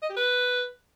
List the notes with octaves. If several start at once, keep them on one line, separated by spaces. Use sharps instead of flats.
D#5
G4
B4